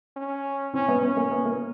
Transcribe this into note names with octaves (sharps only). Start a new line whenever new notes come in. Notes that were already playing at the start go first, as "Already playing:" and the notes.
C#4
C4 C#4
B3
B3 C#4
A#3
B3
A#3